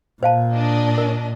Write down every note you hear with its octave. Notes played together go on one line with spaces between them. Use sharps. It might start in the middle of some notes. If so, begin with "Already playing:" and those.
A#2 C5 F5 A5
D4 D#5
A#4